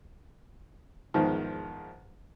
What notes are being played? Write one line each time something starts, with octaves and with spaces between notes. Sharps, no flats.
E2 G#2 D#3 F3